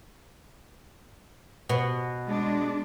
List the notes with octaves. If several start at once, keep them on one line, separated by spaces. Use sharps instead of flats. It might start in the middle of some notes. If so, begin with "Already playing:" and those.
B2
G#3 D4